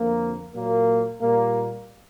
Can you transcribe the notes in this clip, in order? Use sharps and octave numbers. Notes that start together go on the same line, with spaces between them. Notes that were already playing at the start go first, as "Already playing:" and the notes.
Already playing: F2 D3 F3 A#3
A#2 F#3 A#3
A#2 G3 A#3